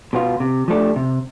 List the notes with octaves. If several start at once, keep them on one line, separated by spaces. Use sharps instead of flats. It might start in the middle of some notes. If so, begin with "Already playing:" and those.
B2 B3 F4
C3
F3 A3 D4 G4
C3